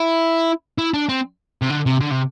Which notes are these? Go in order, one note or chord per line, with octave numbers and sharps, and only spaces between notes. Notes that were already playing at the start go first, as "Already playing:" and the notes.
Already playing: E4
E4
D4
C4
C3
D3
C3
D3
C3